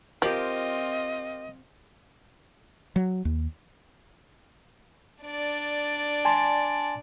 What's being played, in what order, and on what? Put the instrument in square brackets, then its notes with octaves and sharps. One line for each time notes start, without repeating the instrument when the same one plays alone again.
[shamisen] F3 [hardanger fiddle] C4 F4 [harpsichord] G4 A#4 [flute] D#5
[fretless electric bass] F#3
D#2
[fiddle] D4 D5
[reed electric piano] G#5 A5 C6